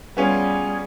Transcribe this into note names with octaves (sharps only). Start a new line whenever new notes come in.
G3 B3 C#4 F4 G#4